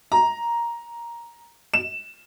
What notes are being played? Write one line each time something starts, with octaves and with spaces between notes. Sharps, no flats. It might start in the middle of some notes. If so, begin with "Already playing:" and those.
A#5
E7